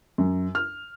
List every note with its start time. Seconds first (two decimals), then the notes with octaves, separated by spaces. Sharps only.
0.18 F#2
0.55 F6